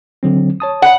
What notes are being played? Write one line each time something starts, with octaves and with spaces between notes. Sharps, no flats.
D3 F#3 C4
C#5 A5 D#6
F#5